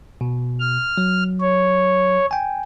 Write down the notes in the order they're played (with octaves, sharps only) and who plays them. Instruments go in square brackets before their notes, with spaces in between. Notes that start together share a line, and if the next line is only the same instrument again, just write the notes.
[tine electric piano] B2
[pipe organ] F6
[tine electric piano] F#3
[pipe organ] C#5
[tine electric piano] G5 G#5